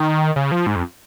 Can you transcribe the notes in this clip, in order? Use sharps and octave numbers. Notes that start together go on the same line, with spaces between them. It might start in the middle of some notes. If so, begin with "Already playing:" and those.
Already playing: D#3
C#3
F3
G#2
F2